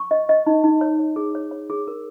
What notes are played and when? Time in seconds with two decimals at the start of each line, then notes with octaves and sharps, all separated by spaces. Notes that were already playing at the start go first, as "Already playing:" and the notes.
Already playing: C#6
0.11 D#5
0.29 D#5
0.47 D#4
0.64 D#4
0.81 C#5
0.99 C#5
1.16 G#4
1.35 C#5
1.51 C#5
1.70 G#4
1.87 A#4